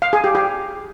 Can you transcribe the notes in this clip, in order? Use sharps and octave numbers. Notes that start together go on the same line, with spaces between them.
F5
G#4
G4
G4